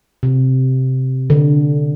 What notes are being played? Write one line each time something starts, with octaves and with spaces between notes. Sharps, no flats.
C3
D3